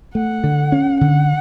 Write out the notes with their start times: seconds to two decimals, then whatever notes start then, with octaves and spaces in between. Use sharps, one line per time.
0.15 A3 F#5
0.44 D3
0.72 C#4
1.01 D3 F#5